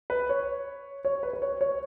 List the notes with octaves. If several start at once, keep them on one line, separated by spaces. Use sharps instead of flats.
B4
C#5
C#5
B4
B4
C#5
C#5